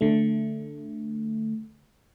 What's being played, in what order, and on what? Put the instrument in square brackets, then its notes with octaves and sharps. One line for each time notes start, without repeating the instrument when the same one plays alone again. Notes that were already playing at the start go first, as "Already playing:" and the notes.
[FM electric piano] D3 A3